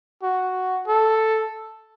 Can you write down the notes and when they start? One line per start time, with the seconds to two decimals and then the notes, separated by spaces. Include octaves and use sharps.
0.23 F#4
0.87 A4